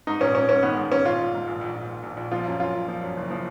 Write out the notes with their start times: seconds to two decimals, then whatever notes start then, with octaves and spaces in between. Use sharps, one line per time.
0.07 G#2 D#4
0.21 A#1 C#4
0.35 G#2 C#4
0.48 G#2 C#4
0.62 D#3 B3
0.76 G#2
0.91 G#2 C#4
1.06 A#1 F4
1.19 A#1
1.34 G#2
1.47 A#1
1.61 A#1
1.75 A#1
1.89 A#1
2.03 A#1
2.17 A#1
2.31 F3 F4
2.46 F#2
2.60 F#2 F4
2.74 F#2
2.88 F3
3.02 F#2
3.17 F#1
3.30 F3